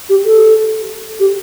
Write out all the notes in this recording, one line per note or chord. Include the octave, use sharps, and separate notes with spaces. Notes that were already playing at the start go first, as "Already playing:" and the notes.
G4
A4
G4